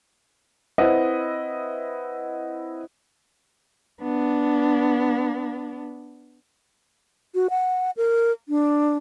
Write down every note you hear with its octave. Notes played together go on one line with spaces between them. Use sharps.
C4 E4 B4 D#5 F#5
B3 D4
F#4
F#5
A#4
D4